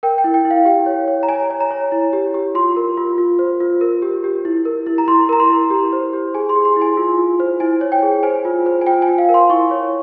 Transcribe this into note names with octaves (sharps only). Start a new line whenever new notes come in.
A#4 G5
G5
E4
G5
E4
F5
G4 G5
C#5
C#5
A#5
C#5 G#5
C#5
A#5
C#5
E4
G4
G4
F4 C6
A#4
F4
F4
C5
F4
A#4
G4
G4
E4
A#4
E4
A#5
E4 C6
A#4 A#5
C6
E4
G4
C5
G4
G#4 G#5
C6
G#4
C6
E4
G#5
F4
F4
C5
E4 G#5
C#5
G5
G#4
C5 G#5
F4
C5
G#5
F4 G5
G#5
F4
F5
A#4
C6
E4 C#6
C#5